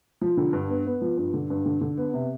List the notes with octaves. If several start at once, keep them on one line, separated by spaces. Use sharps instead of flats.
F3
D3
G2
B3
B3
F3
G2
D3
G2
D3
D3
B3
C3